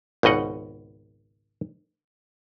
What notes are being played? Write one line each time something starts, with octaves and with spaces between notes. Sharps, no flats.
G#1 C#2 B2 D#5 F#5